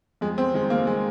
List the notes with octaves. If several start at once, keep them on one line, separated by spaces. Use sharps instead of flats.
F2 G#3
C4
D#3 G#3
A#3
G#3